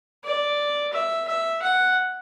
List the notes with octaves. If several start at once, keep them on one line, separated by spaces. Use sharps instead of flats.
D5
E5
E5
F#5